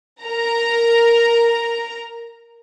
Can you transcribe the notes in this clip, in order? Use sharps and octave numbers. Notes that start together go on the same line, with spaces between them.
A#4 A#5